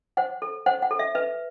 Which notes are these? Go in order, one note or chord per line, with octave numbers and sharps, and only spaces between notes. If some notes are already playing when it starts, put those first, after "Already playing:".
C5 F#5
A4
C5 F#5
F#5
A4
E5
B4 E5